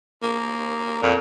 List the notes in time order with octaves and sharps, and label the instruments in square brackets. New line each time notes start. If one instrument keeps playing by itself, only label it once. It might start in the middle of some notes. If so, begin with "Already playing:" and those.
[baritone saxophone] A#3
[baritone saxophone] F2 [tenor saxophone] A#2